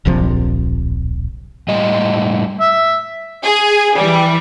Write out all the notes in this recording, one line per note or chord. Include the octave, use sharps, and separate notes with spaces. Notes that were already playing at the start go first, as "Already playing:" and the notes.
D1 A#1 C3 F3
A2 G3 D#5
E5
G#4
E3 G3